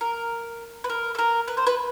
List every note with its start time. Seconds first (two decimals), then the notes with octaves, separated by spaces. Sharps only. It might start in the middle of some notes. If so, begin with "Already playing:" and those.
0.01 A#4
0.84 B4
0.90 A#4
1.15 A4
1.19 A#4
1.48 B4
1.57 C5
1.67 B4